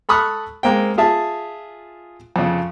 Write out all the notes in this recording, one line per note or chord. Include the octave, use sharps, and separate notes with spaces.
A4 B5 C#6 D#6 F6 F#6
G#3 A#3 C4 G5
F4 G#4 E5 A5
F2 C#3